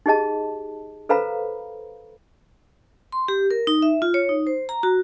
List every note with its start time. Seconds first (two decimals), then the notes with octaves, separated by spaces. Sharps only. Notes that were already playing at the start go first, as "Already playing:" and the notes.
0.06 D#4 G4 G#4 D#5 A5
1.09 A4 B4 C5 F5 A#5 B5
3.12 C6
3.28 G4
3.51 A#4
3.67 D#4
3.82 E5
4.02 F4
4.14 C#5
4.29 D#4
4.47 C5
4.69 A#5
4.83 F#4